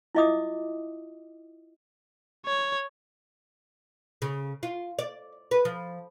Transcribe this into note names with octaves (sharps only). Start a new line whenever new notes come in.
E4 F4 D#5 E5 D6 D#6
C#5
C#3
F4
D5
B4
F3